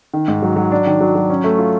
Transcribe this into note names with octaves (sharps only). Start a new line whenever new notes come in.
D#3
G#2
F#3
F#3
D4
D#3
F#3
F#3
C#4
A3
F4